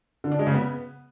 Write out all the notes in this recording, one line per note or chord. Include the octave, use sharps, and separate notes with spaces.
D3
D4
G#3
C#3
B3